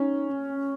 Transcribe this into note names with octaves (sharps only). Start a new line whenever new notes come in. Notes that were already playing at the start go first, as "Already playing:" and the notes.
Already playing: C#4 D#4
C#4